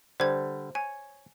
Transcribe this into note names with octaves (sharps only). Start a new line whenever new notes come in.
D3 G3 C5 G#6
C#5 G#5